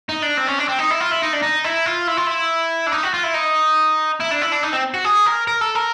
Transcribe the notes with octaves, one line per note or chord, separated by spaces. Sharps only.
D#4
D4
C4
C#4
D4
C4
D#4
E4
F4
E4
D#4
D4
D#4
E4
F4
E4
F4
E4
D4
D#4
F#4
F4
E4
D#4
E4
D4
E4
D4
D#4
C4
F#4
G#4
A#4
A#4
A4
A#4